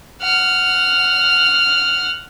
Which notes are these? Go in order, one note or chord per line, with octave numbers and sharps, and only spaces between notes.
F#5 F6